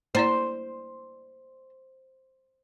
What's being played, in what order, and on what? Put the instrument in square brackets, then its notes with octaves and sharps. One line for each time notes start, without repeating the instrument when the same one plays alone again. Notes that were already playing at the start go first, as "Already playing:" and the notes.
[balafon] A#3 E4 D5 [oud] C5